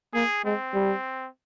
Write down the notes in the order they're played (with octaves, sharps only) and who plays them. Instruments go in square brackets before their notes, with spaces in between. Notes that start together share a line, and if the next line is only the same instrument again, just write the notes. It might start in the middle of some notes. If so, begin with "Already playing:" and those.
[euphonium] A#3 [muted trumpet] G#4
[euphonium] G#3 [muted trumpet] C4
[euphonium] G3